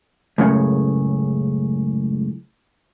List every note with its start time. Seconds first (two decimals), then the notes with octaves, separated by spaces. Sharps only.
0.38 C#2 F#2 A2 C#3